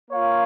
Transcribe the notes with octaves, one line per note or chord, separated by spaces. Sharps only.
A#3 F4 C#5 F5